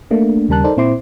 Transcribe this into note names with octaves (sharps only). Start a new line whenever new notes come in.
A3 A#3 D4
D#2 C#3 G3 A#4 A5 F#6
D#4 A4 A#4 C5 D5
A#2 C4 E4 C5 C6 D6